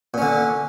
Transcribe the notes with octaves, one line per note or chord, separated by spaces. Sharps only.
A#2 D3 C#4